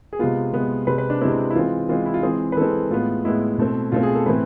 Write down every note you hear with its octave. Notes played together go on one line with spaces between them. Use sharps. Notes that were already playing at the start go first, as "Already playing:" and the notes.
G#4
C3 G#3 B3 F4
C3 G#3 B3
C3 G#3 C4 B4
B4
D4
C3 G#3 C4 E4
E4
E3 G#3 C4 F4
E3 G#3 C4 F4
E4
F4
E3 G#3 C4 G#4
B4
E3 G#3 C4 A4
A2 G#3 B3 F4
A2 G#3 B3 E4
B2 A3 C4
B2 A3 C4 F4
G#4
A4
A2 E3 A3 C4 B4